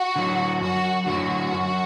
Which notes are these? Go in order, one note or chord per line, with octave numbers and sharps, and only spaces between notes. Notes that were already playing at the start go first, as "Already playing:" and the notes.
Already playing: F#4
D3 F#3
F#2 F#4
D3 F#3 F#4
F#2